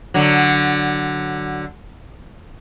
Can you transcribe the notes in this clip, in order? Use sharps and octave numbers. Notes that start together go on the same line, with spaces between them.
D3 F#3